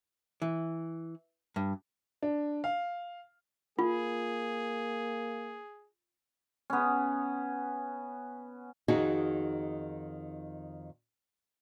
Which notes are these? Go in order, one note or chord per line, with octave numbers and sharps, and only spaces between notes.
E3
G2
D4
F5
A#3 F4 G#4
B3 C#4
F2 D#3 D#4 F#4 G#4